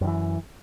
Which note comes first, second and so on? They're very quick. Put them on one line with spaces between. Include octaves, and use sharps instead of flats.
F#2 D#3 E3